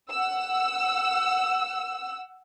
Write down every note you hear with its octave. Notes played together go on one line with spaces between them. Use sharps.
F#5 E6